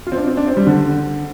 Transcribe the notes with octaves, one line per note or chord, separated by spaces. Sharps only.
F4
C4
D4
C4
D4
C4
G3
D3